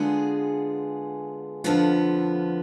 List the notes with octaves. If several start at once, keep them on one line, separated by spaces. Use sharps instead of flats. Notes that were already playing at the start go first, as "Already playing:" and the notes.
Already playing: D3 G#3 B3 F4 G#4
F2 D3 F3 B3 F4